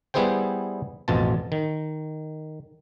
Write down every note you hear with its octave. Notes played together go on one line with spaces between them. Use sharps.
G3 B3 E4 G#4 C5 G5
A1 F2 B2 F4 A5
D#3